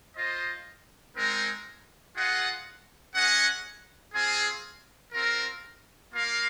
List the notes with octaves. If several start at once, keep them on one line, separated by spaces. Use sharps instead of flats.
F4 C5 D#5
G#3 C4 D#4 A#4
F4 G#4 D#5 F#5
C#4 G#4 D#5 F#5
C4 F4 G#4
C4 F4 A#4
A#3 F4 A#4 F5